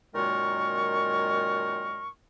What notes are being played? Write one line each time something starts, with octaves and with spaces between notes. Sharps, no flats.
F#2 A#2 D#3 G#3 A#4 C#6